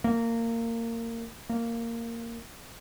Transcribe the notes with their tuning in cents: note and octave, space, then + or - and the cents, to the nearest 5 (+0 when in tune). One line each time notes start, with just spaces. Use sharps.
A#3 -20
A#3 -10